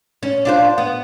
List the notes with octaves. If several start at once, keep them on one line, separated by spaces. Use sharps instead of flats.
C#4
D4 F4 C5
B3